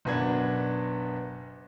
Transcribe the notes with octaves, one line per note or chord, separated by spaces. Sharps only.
F#1 B2 B3 D4 G#6